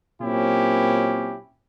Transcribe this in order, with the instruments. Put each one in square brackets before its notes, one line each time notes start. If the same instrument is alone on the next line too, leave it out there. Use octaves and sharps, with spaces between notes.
[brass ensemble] A#2 F#3 C4 C#4 E4 G4